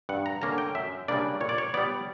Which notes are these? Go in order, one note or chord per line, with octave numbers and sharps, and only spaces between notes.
G2 F#5
A#5
D3 A#3 C#4 A#5
G5
F#2 E5
C#3 G3 A#3 D4 D5
A#2 C#5
D5
C#5
G3 B3 D5